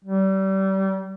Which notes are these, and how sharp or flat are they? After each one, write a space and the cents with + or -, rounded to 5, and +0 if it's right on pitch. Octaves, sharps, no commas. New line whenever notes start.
G3 -30